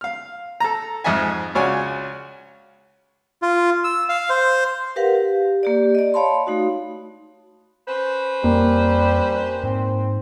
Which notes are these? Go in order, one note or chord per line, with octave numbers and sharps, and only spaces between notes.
F5 F6
A4 A#5
F2 G#2 D#5 E5 G#5
C#2 C#3 F#4 C#5 D5 G#5
F4
E6
F5
C5
G4 A#4 B4 F5 F#5
G4
A#3 G4 D5
D5 D#5
C#5 F5 A5 B5 C6
A3 D#4 F#4
C#4 B4 C5
F2 G3 A#3
G#2 C4